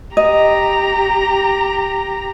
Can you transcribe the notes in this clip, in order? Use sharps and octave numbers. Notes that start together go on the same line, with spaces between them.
G4 D#5 A#5